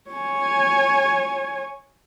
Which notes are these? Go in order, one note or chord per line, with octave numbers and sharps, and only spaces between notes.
C#5 G#5